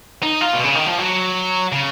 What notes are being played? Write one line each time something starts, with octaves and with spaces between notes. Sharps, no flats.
D#4
F4
B2
C#3
D#3
F3
F#3
C#3